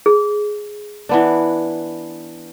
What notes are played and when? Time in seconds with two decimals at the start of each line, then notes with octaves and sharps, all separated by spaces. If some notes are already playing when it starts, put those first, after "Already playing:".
0.06 G#4
1.09 E3 B3 D4